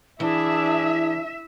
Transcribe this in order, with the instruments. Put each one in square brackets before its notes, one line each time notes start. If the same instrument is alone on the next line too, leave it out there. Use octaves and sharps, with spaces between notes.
[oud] E3 [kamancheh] D4 G#4 [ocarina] E4 [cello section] E5